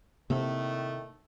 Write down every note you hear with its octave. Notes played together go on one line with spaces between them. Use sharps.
A2 C3 D#3 A3 A#3 C4